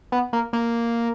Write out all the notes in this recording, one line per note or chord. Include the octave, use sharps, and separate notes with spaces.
B3
A#3
A#3